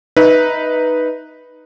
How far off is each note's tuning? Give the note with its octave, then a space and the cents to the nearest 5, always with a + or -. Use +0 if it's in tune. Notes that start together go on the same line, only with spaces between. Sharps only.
D#4 +0 B4 -5 E5 -20